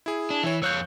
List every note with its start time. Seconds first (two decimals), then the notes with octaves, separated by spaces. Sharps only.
0.06 E4 G#4
0.30 D4
0.43 E3 E4 C#5
0.62 F2 C#5 F5 E6 F#6 G6